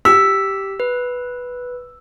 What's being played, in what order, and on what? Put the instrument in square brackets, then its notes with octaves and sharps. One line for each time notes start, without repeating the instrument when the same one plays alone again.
[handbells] G4 B6 [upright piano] E6
[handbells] B4